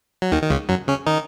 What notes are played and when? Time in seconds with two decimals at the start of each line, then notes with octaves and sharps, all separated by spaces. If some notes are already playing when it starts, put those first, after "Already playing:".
0.22 F#3
0.32 D#2 D#3
0.42 D#3
0.50 C#2 C#3
0.69 F#2 F#3
0.88 C#3 C#4
1.07 D#3 D#4